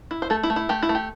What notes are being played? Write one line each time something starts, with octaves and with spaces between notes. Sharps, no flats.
E4
C5
A3 A4
E4
A3
E4
A3 G4
E4
A3
G4